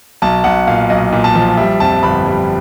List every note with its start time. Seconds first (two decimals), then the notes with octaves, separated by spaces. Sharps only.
0.22 B1 A5
0.44 B1 F#5
0.67 A#2 F5
0.90 B1 D#5
1.12 A#2
1.24 A5
1.35 F3
1.57 G3 E5
1.80 F2 A5
2.03 G1 B5
2.26 G3